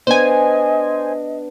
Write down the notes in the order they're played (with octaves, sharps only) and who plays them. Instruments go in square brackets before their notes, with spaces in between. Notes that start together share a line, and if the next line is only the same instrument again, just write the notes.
[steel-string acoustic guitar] B3 D4 [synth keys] C5 G#5 [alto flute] D#5